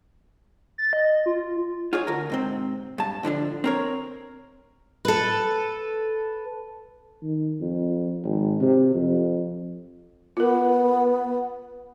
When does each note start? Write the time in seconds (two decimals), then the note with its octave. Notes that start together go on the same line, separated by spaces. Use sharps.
0.78 A6
0.93 D#5
1.26 F4
1.93 F4 G#4 C#5
2.07 D2 A#4
2.30 G#2 C3 C4
2.98 G2 A5
3.23 A2 D3 F3 D4
3.64 C4 A#4 C#5
5.05 A4 B4
7.23 D#3
7.61 F2
8.25 G#1
8.61 C3
8.95 F2
10.37 B3 F4 A#4